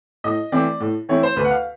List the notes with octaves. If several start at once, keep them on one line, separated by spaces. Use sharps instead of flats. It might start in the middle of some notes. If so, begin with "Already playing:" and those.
A2 D#5
E3 A3 C4 E4 D5
A2
E3 A3 C4 E4 C#5
C5
D2 B4
F#5
F5